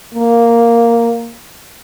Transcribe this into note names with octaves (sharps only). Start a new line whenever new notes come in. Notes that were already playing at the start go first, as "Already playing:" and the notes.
A#3